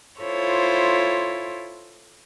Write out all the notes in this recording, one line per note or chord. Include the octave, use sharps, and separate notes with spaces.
E4 F4 A4 C5 C#5